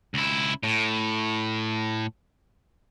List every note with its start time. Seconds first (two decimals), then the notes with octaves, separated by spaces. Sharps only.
0.14 C#2 E4
0.63 A2